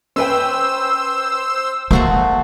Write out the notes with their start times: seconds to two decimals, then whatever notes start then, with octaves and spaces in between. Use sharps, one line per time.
0.16 C#4 B4 C5 G5 E6
1.91 E2 A3 A#3 F#4 C5